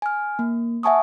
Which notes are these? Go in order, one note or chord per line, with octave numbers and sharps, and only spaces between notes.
G#5 F6
A#3
E5 F#5 G#5 A5 C#6 D#6